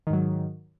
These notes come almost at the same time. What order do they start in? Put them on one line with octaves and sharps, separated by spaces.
D#3 G#2 F#3